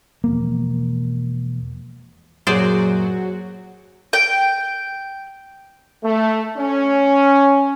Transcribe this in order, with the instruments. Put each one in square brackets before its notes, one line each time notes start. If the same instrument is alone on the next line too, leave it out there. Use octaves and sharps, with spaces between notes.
[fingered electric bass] E1 F3 A#3
[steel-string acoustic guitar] F#2 A#2 [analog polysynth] F#3 F#4 [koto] G#4 C5 D5
[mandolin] G5
[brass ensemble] A3
C#4